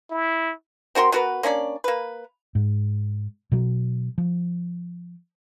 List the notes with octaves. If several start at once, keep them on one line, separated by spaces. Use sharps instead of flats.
E4
C4 F#4 A#4 C6
B3 F#4 A#4 B4
A#3 C#4 D4 D5
A#3 B4
G#2
B2 F#3
F3